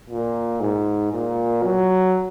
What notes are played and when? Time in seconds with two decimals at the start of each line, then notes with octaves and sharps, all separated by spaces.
0.10 A#2
0.60 G#2
1.13 A#2
1.63 F#3